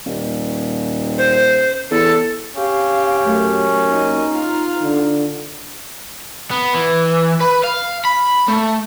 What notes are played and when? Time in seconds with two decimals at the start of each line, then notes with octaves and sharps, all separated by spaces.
0.06 D#1
1.18 C5
1.91 E2 A4
2.56 C#4 G4 F5
3.25 F#2 A3
3.88 A#3 D#4 D#5
4.31 F4 F5
4.83 D3
6.51 B3
6.75 E3
7.41 B4
7.64 F5
8.05 B5
8.48 A3